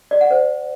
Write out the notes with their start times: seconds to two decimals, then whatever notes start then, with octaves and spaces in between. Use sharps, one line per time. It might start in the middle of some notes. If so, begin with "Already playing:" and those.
0.11 D5
0.21 F#5
0.31 C5